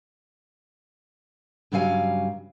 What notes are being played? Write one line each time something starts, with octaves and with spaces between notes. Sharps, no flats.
G2 C#3 F#3 G3 F5 G#5